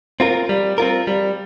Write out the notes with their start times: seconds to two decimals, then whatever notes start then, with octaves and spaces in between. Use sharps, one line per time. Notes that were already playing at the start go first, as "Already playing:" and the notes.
0.20 C4 F4 A#4
0.49 G3
0.78 C4 F4 A#4
1.07 G3